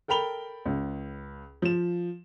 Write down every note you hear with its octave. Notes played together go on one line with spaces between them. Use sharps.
A4 A#4 G5 B5 F7 G7
C#2
F3 E7